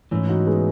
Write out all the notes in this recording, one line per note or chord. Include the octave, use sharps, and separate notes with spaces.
G#2 E3 A3 C#4 E4
D#4 F#4
G#3 B3